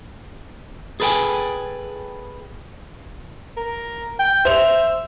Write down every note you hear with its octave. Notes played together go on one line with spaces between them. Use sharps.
G#4 A4 B4 D#5 G5 G#5
A#4
G5
C5 E5 F7